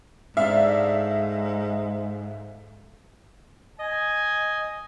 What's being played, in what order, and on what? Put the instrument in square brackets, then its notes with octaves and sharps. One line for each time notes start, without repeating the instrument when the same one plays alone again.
[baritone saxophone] G#2 [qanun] A3 D4 D5 [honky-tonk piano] E5 F5
[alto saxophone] D#5 [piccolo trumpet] G#5